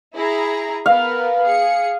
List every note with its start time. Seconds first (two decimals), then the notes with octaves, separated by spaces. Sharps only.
0.14 E4 G#4 A#5
0.86 B3 A#4 B4 F5
1.43 G#4 C#7